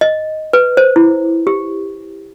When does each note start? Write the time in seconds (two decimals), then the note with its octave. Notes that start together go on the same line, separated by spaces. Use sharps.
0.01 D#5
0.53 B4
0.77 C5
0.96 E4
1.47 G4